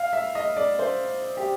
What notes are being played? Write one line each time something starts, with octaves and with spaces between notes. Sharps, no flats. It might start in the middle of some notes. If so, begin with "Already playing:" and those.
Already playing: F5
E5
D#5
D5
C5
G4